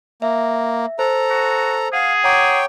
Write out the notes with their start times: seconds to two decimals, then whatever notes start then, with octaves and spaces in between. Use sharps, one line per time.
0.22 A#3 E5
0.99 A4 C5 A#5
1.30 F#4
1.93 G#4 F5 F#5
2.24 C#5 F#5 G5 A#5 D6